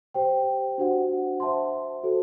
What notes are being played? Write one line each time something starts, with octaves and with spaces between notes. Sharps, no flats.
G4 C5 G5
D4 F#4 C5 F#5
C5 E5 A5 C6
F#4 A4 C5